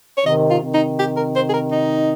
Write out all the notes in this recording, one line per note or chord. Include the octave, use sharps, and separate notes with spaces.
C#5
C3 D#3 D#5
F4
C3 D#3
D#4
G4
A#4
C5
G#4
A#4
D#4